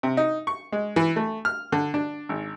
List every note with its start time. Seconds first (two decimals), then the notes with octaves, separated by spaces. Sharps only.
0.03 C3
0.17 D#4
0.47 C#6
0.72 G#3
0.96 E3
1.16 A3
1.45 F6
1.72 D3
1.94 D4
2.29 G#1